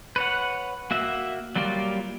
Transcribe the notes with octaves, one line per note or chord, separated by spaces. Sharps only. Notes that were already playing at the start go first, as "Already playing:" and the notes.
B4 C#5 F#5
A#3 F#4 E5
F#3 G3 A#3 F4 D5